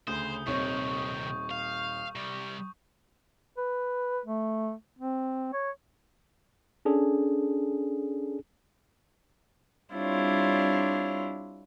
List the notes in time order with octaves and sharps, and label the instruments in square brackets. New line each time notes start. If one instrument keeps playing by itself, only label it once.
[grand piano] D2 C#3 [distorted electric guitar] C5 [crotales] D#6 G6
[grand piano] D#1 C4 C#5 [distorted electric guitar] C3 D#3 [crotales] C#6
[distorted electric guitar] F5
C3 G3
[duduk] B4
A3
C4
C#5
[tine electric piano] C#4 D4 G#4 A4
[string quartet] G3 C4 D4 E4 F4 C#5